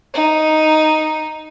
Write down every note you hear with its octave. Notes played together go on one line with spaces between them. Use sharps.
D#4